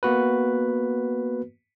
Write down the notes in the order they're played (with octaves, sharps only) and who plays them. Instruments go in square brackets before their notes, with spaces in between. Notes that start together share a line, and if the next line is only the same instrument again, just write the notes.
[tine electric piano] A#3 B3 F#4 B4